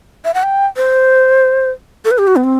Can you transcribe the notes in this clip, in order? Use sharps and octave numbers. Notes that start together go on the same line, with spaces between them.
E5
F#5
G5
C5
A4
B4
G4
F#4
B3
C4